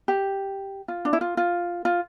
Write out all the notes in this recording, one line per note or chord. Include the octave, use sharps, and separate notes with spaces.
G4
F4
D4
E4
F4
F4
F4